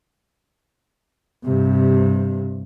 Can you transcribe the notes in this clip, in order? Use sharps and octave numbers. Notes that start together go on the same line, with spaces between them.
G2 C3